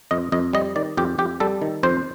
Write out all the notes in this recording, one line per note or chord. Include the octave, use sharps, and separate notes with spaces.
F2 D#5
F2 D#5
G3 D#5
D#3 D5
F2 G4
F2 G4
G3 A4
D#3
F2 C5